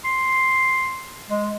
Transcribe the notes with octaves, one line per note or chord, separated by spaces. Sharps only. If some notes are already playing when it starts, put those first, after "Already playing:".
C6
G#3